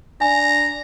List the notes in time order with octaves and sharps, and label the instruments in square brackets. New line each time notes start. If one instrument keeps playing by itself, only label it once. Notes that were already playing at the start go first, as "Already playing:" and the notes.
[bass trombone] D4 [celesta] G#5 [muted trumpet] A#5